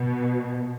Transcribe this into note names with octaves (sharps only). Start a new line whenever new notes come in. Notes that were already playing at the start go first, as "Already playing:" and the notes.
Already playing: B2